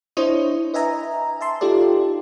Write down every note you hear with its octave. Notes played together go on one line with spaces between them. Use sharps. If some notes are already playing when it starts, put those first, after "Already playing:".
D4 E4 C5 C#5 D#5
B4 D#5 E5 G#5 A#5
E5 A5 C6
D#4 F4 G4 A4 D5